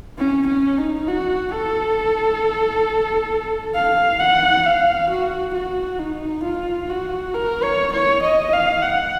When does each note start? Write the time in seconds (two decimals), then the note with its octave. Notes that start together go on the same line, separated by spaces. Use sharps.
0.19 C#4
0.48 C#4
0.79 D#4
1.08 F#4
1.52 A4
3.75 F5
4.20 F#5
4.66 F5
5.10 F#4
5.54 F#4
5.99 D#4
6.44 F4
6.89 F#4
7.34 A#4
7.63 C#5
7.93 C#5
8.23 D#5
8.53 F5
8.82 F#5